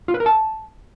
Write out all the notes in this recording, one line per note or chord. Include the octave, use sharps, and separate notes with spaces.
F4
B4
A#4
A5